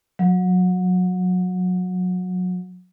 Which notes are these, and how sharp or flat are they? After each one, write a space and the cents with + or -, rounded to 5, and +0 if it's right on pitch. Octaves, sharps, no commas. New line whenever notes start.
F#3 -25